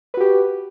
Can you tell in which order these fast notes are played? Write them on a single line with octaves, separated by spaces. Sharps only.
B4 F#4 G4